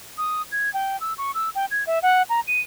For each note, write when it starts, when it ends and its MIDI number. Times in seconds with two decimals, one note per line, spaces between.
0.18 0.42 87
0.51 0.72 92
0.74 0.99 79
1.00 1.13 88
1.18 1.34 85
1.34 1.49 88
1.55 1.66 79
1.70 1.84 92
1.87 1.99 76
2.02 2.22 78
2.29 2.40 82
2.47 2.61 99